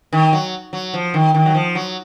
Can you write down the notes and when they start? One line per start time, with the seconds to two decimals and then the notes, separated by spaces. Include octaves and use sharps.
0.13 D#3
0.33 F#3
0.73 F#3
0.94 F3
1.14 D#3
1.34 D#3
1.46 F#3
1.55 F3
1.75 F#3